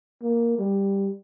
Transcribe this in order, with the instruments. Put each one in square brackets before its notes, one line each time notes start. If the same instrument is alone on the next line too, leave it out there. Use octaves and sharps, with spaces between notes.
[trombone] A#3
G3